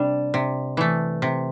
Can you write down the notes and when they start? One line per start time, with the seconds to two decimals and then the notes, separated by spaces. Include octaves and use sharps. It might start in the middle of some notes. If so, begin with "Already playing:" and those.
Already playing: C3 G3 D4
0.34 C3
0.77 E3 A3
1.22 C3